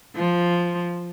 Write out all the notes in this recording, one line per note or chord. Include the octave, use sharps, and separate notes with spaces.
F3